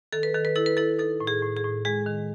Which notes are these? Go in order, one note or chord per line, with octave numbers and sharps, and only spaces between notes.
D#3 A4
B4
D#3 A4
B4
E4 A4
B4
E4 A4
D#4 A4
A2
G#4
A2
G#4
A2
G#3 G#4
D#3